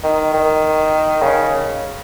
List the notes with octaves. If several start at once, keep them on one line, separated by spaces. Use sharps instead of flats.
D#3
D#3
C#3